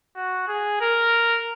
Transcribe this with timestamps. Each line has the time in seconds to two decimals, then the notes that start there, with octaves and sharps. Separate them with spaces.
0.16 F#4
0.48 G#4
0.81 A#4